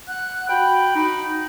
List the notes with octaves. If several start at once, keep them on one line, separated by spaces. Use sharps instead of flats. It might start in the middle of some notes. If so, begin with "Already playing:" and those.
F#5 F#6
F#4 G5 B5
D#4